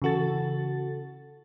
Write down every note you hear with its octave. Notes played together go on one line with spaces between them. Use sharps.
C#3 E3 F#4 A4 A6